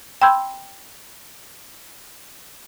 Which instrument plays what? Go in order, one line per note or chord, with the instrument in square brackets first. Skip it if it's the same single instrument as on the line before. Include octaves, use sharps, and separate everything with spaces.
[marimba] G5 B5 C6 E6 G6 G#6